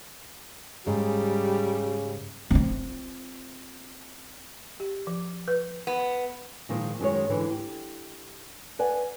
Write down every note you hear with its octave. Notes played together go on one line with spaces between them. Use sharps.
G#2 C#3 G3
C4 F4
G4
F3
B4
B3
A#2 D#3 F3 G#3
F#2 D#3 G#3 C#5
G#2 D3 E3
G4
B4 D5 F#5 G#5